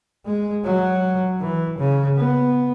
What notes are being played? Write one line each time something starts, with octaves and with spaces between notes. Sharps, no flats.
G#3
F#3
E3
C#3
B3